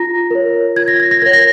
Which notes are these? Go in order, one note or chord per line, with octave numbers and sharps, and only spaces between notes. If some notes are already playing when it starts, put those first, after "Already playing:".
Already playing: F4 A#5 A#6
A#4 C#5
F4 G#6
A#6
G#6
A#6
A#4 C#5 G#6
A#6